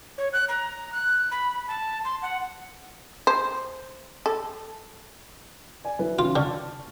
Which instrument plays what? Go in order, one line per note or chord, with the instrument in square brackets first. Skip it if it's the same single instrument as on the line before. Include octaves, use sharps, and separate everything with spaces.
[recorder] C#5
F#6
A#5
F#6
B5
A5
C6
F#5
[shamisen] C5
A4
[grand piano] D5 G#5
F#3 E4 B4
[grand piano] D#3 C#4 [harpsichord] F4
[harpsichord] D3 [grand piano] A5 C#6 F6